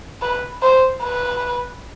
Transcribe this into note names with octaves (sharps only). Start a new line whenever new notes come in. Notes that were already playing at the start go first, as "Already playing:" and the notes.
B4
C5
B4